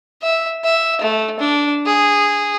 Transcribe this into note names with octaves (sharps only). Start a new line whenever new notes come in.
E5
E5
A3
D4
G#4